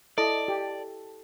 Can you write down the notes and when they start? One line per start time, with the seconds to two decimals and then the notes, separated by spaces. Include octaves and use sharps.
0.18 E4 A4 D5 D#5 A5
0.48 G4